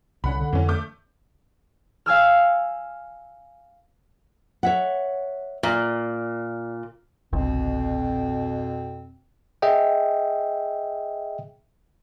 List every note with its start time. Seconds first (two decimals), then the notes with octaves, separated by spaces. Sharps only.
0.24 C2 F#3 C#4 F#5 B5
0.37 D3
0.53 F2 E3 C#4
0.68 A3 D6 G6
2.06 F5 G#5 E6 F6
4.63 C#5 E5 F#5
5.63 A#2 D5
7.33 G1 C2 F2 B2 C4
9.62 G#4 D#5 E5 G5